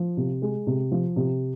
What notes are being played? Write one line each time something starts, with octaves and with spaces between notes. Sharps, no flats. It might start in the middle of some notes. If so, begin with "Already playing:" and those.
Already playing: F3
C3
G#3
C3
F3
C3